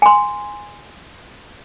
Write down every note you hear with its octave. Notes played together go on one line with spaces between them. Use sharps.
G#5 C6